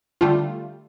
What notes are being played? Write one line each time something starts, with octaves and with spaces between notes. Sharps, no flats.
D3 G3 A3 F4